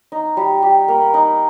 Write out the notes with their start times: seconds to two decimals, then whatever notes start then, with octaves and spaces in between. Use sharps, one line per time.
0.12 D#4
0.37 G3
0.62 G4
0.88 A#3
1.14 D#4